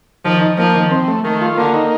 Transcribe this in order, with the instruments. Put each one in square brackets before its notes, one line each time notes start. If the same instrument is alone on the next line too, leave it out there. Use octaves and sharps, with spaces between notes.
[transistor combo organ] D#3 [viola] F3
[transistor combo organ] D#4
[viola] F3 [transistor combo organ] A#3
[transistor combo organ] D#3
C4
A3
[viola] D#3 [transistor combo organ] A3
[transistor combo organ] F4
[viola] D3 [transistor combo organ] A#3
[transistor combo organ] D#4